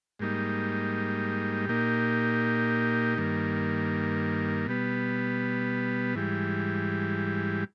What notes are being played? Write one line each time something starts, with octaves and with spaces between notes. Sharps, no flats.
G#2 G3 A#3 D#4
A#2 A#3 D#4 G4
G2 D#3 A#3
B2 G3 B3
G#2 E3 G3